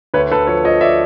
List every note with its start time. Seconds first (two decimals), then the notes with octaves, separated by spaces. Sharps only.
0.14 D2 B4 C#5
0.32 D2 A4 B4
0.47 F3 B4 C#5
0.64 F3 C#5 D#5
0.81 D5 E5